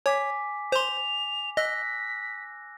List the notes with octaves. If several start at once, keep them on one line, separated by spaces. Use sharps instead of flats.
C#5 G#5 D6 B6
C5 C6 F7
D#5 E6 F#6 A#6 B6